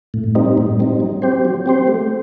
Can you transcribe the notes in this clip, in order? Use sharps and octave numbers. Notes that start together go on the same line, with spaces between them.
A2
G3 C4 D#4
A2
G3 C4 D#4
F#3
C4 G4 C5
F#3
C4 G4 C5
A3